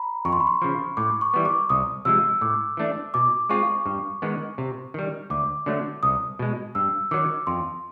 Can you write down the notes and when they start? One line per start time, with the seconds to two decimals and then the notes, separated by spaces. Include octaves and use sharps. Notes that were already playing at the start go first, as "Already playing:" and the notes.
Already playing: A#5 B5
0.25 F2 C#6
0.33 C6
0.40 B5
0.47 C6
0.62 C#3 F3
0.97 A2 D6
1.21 C#6
1.34 E3 G3 B3
1.45 D6
1.70 C2 D#6
2.05 C3 F3 G#3 E6
2.41 A2 D6
2.77 E3 A3 D4
3.14 B2 D6
3.49 G#3 C4 F4 G#4 C#6
3.86 G2
4.22 D#3 G#3 B3
4.58 C3
4.94 D#3 G3
5.30 D2 D6
5.66 D3 F#3 A3
6.03 C2 D#6
6.39 B2 G#3
6.75 G2 E6
7.11 D#3 F#3 D6
7.47 F2 C6